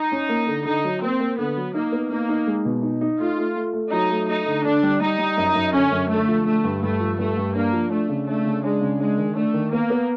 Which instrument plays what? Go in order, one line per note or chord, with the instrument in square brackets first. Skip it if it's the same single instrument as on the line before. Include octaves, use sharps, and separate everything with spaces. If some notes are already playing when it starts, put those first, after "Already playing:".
Already playing: [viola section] D#4
[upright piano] C#4
A#3
D3
[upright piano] D3 [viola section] D#4
[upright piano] F#3
[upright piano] A#3 [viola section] C4
[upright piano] A#3
[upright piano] D3 [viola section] B3
[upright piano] F#3
[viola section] A#3 [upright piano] D#4
[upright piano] B3
[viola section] A#3 [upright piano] D#4
[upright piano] D#4
G#3
B2
D#4
D#4
[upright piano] A3 [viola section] F4
[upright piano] A3
A3
A3
[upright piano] F#3 [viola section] D#4
[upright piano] A3
[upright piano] A3 [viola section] D#4
[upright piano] D3
[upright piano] D3 [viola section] D4
[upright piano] G3
[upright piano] G3 [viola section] D#4
[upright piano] G3
F#2
F#2
[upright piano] D3 [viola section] C#4
[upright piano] F#2
[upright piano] D3 [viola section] A3
[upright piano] F3
[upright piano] D3 [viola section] A3
[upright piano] G2
[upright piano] G2 [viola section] A3
[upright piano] F3
[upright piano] G2 [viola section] A3
[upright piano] G2
[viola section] A#3 [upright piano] D4
[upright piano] F3
[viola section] A3 [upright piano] D4
[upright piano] C#3
[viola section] A3 [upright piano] D4
[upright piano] C#3
[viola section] G#3 [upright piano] D4
[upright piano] C#3
[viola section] G#3 [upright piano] D4
[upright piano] D#3
[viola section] A3 [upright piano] D4
[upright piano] D#3
[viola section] A#3 [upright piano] B3
[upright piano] B3